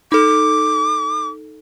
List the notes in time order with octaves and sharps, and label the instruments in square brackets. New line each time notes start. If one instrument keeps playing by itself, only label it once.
[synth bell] D#4 A4 [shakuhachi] D6